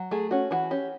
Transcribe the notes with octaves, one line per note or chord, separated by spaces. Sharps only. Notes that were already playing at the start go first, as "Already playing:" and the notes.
Already playing: F#3
A3 G#4
C#4 F#4
E3 F#4
C#4 G4